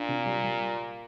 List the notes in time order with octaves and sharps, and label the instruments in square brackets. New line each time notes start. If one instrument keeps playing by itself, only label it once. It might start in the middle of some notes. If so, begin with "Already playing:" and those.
Already playing: [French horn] A#2 [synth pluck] D4
[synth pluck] C3
G3
G3